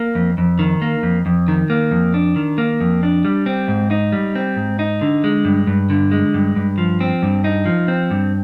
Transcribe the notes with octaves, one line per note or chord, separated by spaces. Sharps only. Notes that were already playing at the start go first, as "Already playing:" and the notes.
Already playing: A#3
F2
F2
D#3
A#3
F2
F2
D#3
A#3
F2
D4
D#3
A#3
F2
D4
G3
C4
G#2
D#4
G3
C4
G#2
D#4
D3
G#3
G2
G2
D3
G#3
G2
G2
F3
C4
G2
D#4
F3
C4
G2